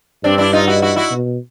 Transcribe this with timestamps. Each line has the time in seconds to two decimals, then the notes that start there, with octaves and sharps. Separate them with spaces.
0.24 G2 C4 D4
0.38 D4 E4
0.53 D#4 F4
0.67 E4 F#4
0.82 E4 F#4
0.96 E4 F#4
1.11 B2